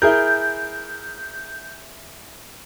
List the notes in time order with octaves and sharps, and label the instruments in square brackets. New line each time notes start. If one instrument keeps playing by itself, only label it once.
[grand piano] E4 G#4 A#4 [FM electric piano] G6